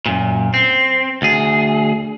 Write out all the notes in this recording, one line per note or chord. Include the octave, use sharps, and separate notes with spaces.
F#2 A#2
C4
D2 G#4